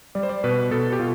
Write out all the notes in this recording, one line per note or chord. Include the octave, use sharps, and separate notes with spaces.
G3 D5
C5
D5
B2 B4
B2 A4
G4
B2 F4